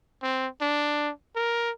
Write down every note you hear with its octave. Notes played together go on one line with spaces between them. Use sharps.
C4
D4
A#4